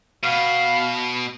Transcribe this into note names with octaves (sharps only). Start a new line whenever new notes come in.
B2 F5